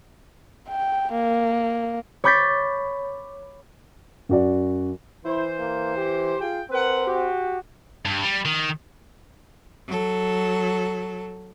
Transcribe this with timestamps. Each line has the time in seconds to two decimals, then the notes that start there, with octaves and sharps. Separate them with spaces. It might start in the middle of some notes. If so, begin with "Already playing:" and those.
0.69 G5
1.13 A#3
2.24 C#5 B5 D6 G6 A6 B6
4.29 F#2 F#4 D5
5.25 E3 E4 C5
5.59 A#3
5.97 G4
6.40 F4 G#4 G5
6.70 C4 A#4 B4 F#5
7.07 F#4 G4
8.06 G2
8.23 G3
8.45 D#3
9.87 F#3 A4